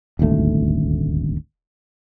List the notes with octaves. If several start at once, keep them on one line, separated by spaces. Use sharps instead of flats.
D#1 G#1 D2 A3